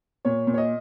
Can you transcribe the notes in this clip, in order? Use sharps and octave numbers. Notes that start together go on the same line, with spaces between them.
A#2 C#5
A#2
C#5
D#5